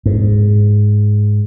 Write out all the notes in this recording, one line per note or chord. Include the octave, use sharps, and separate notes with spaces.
G#2